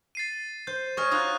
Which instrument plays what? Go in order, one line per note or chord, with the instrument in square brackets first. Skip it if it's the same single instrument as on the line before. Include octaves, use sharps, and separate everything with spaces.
[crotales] A6 C7 D#7
[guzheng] C5 [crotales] G6
[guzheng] C#5 D#5 G#5 [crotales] C#6 F6
[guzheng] D#4 F4 F#4 [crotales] D#6 F#6